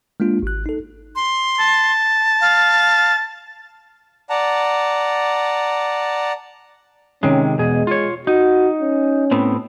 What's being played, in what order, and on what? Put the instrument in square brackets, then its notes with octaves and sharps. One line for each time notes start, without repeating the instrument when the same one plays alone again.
[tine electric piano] G#3 A#3 D4 F4
G#1 F#6
D#4 A4
[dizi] C6
[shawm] A5
[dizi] F5
[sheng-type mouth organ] D5 F#5 A5 A#5
[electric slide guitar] C3 D#3 G#3 [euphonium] C#4
[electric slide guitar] E2 B2 G#4 [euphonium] G#3
[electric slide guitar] F4 C#5
[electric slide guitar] D#4 [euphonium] F#4
[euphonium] C#4
[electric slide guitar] A2 B3 C4